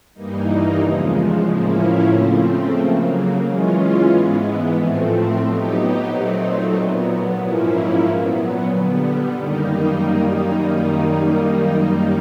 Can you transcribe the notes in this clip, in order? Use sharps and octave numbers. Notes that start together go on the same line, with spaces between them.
G2 E3 G3 A#3 D#4
E2 C#3 F3 G#3
A2 F3 A#3 C#4 E4
C#3 F3 A3 C4
C#3 F#3 A#3
E3 G#3 C#4 F4
G#2 E3 G#3 B3
A2 F3 A3 C4
F#3 B3 D#4 G4
A#2 F#3 A3 C4 D#4
A#2 F#3 B3
G#2 F3 A#3 C#4 E4
A#2 F#3 B3
D3 G3 B3
F#2 D#3 G3 A#3 D#4